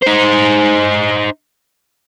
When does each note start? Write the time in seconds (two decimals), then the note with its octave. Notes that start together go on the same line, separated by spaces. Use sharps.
0.02 D#4 C5